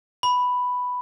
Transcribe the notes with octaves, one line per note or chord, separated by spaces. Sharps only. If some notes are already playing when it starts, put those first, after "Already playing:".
B5